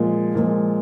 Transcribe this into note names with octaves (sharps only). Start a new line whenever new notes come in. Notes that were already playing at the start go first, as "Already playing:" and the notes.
Already playing: A#2 F3 G#3
A#2 F3 G#3